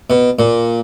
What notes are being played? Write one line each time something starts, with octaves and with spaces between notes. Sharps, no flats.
B2
A#2